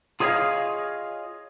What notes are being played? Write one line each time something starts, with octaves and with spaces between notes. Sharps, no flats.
F4 G#4 C#5 D#5 F5